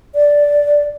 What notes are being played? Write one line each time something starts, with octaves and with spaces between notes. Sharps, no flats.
D5